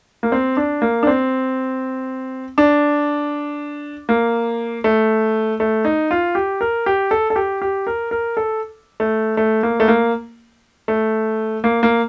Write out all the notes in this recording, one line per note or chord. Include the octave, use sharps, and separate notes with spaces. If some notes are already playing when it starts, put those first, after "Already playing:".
A#3
C4
D4
A#3
D4
C4
D4
A#3
A3
A3
D#4
F4
G4
A#4
G4
A4
A4
G4
G4
A#4
A#4
A4
A3
A3
A#3
A3
A#3
A3
A#3
A#3